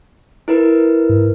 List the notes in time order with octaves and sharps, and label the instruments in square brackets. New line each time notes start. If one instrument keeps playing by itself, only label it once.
[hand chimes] E4 A#4 B4
[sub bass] G#2